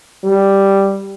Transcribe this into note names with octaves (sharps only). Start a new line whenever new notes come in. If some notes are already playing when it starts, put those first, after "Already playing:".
G3